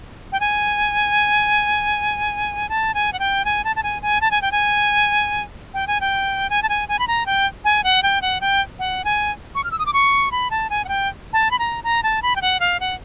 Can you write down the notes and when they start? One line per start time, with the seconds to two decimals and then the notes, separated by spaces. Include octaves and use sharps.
0.32 G5
0.40 G#5
2.69 A5
2.94 G#5
3.13 F#5
3.19 G5
3.45 G#5
3.64 A5
3.76 A5
3.83 G#5
4.02 G#5
4.21 A5
4.31 G#5
4.42 G5
4.52 G#5
5.74 G5
5.87 G#5
6.01 G5
6.50 G#5
6.63 A5
6.69 G#5
6.88 G#5
6.99 B5
7.08 A#5
7.26 G5
7.64 G#5
7.84 F#5
8.03 G5
8.22 F#5
8.41 G5
8.79 F#5
9.05 G#5
9.55 C#6
9.64 F6
9.71 E6
9.79 D#6
9.86 D6
9.93 C#6
10.32 B5
10.51 A5
10.70 G#5
10.85 F#5
10.88 G5
11.33 A5
11.51 B5
11.59 A#5
11.84 A#5
12.03 A5
12.22 B5
12.36 G5
12.42 F#5
12.60 F5
12.80 F#5